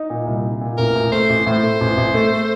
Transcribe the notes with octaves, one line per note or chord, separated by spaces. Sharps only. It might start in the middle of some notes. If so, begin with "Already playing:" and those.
Already playing: D#4
A#2
C2
D#4
A#2
A1 A#4
A1
A3 C5
A1
A2 C5
A3
A1
A1
A3
A3